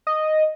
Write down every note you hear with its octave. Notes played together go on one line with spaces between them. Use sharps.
D#5